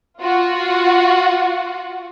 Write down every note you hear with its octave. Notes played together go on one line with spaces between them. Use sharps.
F4 F#4 F#5